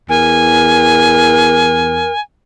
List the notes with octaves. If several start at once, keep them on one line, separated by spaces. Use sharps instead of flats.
E2 A#4 G#5